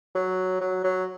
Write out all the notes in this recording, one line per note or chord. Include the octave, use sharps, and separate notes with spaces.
F#3
F#3
F#3